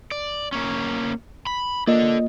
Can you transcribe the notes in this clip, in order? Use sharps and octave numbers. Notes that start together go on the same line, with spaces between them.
D5
A#3 C#4
B5
A#3 F4 A4 D5 D#5